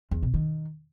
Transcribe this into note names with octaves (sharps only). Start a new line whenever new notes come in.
E2
B2
D#3